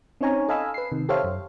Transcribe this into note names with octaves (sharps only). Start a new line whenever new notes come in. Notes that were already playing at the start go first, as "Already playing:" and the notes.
C4 C#4 D#4 C#5 G#5 A#5
A4 D#5 F5 G#5 B5 E6
B4 C7
C3 D#3
G4 A4 C5 C#5 E5 F5
F#2